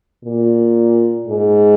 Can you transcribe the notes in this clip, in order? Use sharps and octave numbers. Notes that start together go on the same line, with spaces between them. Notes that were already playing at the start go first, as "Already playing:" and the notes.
A#2
G#2